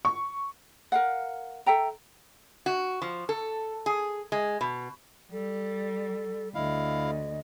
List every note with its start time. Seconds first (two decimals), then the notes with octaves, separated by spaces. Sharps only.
0.05 C#6
0.92 A#4 F5 F#5
1.66 A4 E5 G5 A#5
2.66 F#4
3.02 F3
3.29 A4
3.86 G#4
4.32 G#3
4.61 B2
5.33 G3 A4
6.55 D2 E4 D#5 F5